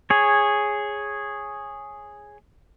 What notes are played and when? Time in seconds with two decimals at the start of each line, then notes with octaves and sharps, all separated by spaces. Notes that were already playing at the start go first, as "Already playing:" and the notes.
0.10 G#4 C#5